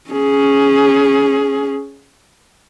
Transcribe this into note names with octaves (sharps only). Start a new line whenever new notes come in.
C#4 G#4